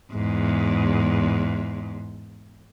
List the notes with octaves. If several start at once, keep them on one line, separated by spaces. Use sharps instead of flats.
E2 G#2